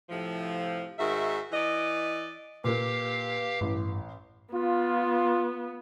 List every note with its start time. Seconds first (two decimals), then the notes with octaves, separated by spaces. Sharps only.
0.09 A2 C3 F3
0.98 G#2 D#3 F#4 E5
1.52 E3 D5 D#5
2.64 A#2 A#3 G4 B4 F5
3.61 A1 G2
4.53 B3 F4